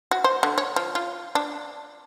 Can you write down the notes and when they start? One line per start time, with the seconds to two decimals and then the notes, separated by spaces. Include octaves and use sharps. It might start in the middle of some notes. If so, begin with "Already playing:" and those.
0.11 F#4
0.24 C5
0.43 D3
0.58 C#5
0.76 F3
0.95 F4
1.35 D4